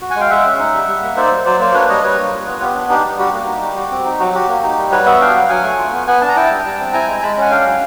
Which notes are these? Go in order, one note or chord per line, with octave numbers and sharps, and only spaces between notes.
F#4
F#5 G#5
G#3 F5 G5
G#3 E5 F#5
C#4
D#4
G3
G3
A#3
D#4 C5 D5
F#3
F#3 C5 D5
A#3 C5 D5
D4 B4 C#5
G3 C#5 D#5
G3 B4 C#5
A#3
F4
B3
B3 G4
D4
D#4 G4
G3
F#4 G4
A#3
D#4
G3
F#4
C4
D#4
F#3 F#4
F#4 G4
A#3
D#4
G3
F#4 B4 C#5
B3 E5 F#5
D4 F5 G5
F#3
F#3 F#5 G#5
A3
F4
B3
B3 F#5 G#5
D4 A5
A#5
E4 G5 A5
G3
G3
C4
E4 G#5 A#5
G#3
G#3 A5 B5
C#4 F#5 G#5
D4 F5 G5
F#3